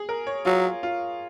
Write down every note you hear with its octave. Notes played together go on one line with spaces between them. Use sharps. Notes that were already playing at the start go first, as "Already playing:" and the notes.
Already playing: G#4
A#4
C#5
F#3 F4
F4